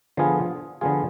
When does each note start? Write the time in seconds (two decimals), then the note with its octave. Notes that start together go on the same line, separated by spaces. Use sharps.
0.17 D3 F3 B3 F4 G#4
0.81 D3 F3 B3 F4 G#4